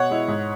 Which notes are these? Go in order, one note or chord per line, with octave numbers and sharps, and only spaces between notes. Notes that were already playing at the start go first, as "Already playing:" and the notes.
Already playing: B2 C#5 F#5
G#3 E4
G#2